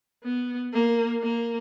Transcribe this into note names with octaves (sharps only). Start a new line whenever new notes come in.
B3
A#3
A#3